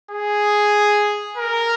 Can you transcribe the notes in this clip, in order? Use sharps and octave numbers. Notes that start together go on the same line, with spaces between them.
G#4
A#4